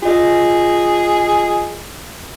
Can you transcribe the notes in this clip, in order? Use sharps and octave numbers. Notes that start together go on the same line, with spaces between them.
F4 G#4 D#5